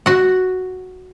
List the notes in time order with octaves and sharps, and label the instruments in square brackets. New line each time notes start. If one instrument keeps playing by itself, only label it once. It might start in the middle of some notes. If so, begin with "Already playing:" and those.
[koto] F#4 F#5